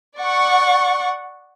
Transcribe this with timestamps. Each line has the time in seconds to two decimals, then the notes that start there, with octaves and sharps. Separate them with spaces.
0.17 D5 F#5 C#6